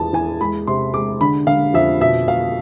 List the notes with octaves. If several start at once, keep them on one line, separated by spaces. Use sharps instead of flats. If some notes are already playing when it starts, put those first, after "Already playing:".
Already playing: E2 F3 G#3 A5
E2 G#5
G#3 B5
C3 C6
G#3 D6
D3 B5
D3 F5
F2 E5
B2 E5
B2 F5